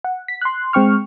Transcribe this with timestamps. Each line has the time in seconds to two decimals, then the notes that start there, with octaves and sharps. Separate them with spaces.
0.04 F#5
0.28 B6
0.41 C6 F#6
0.73 G#3 C4 G5 C#6 F6